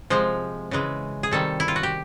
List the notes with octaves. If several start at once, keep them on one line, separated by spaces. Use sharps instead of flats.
C3 F3 G#3 C5
C#3 E3 G#3
G#4
C3 D#3 G3 A4
E4
F4
F#4
G4